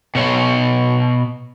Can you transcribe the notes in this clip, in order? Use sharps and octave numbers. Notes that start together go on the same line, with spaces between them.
B2 C#5